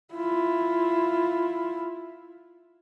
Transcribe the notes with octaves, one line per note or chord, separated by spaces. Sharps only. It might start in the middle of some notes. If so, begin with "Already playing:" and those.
E4 F4